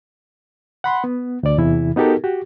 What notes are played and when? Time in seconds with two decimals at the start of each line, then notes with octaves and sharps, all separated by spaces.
0.84 F#5 B5 C6
1.04 B3
1.43 D2 D5
1.58 E2 C3 E3 E4
1.96 B3 D#4 F#4 G4 A4 A#4
2.24 F#4 G4